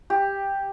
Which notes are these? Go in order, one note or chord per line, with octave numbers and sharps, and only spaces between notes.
G4